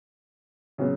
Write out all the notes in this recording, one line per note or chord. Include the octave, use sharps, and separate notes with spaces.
C#3 F#3 B3